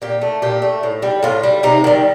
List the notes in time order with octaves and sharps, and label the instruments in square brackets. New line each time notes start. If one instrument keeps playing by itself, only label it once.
[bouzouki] A#2 G4
A3
A#2 G4
A3
A2
G3
A2 F4
G3
C3 D#4
D#3 G3